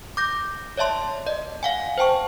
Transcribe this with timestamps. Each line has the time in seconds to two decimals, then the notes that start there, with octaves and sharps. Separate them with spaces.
0.17 D6 G6 A#6
0.77 C#5 D5 E5 A5 C6
1.27 D5 D#5
1.63 F5 F#5 G#5
1.98 C5 G5 A5 C#6